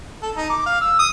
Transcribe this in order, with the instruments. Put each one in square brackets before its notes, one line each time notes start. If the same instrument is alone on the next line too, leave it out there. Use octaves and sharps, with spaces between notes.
[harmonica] A4
D#4
D6
F5
E6
D#6